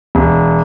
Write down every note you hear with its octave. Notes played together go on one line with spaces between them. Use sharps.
E1